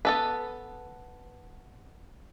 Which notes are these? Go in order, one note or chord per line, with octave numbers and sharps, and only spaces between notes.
B3 A4 B4